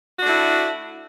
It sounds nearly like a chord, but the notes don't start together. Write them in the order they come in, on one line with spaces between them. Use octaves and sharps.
F#4 D4 A3 E4